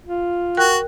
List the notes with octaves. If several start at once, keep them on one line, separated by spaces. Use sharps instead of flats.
F4
F#4 A#4 G5 F#6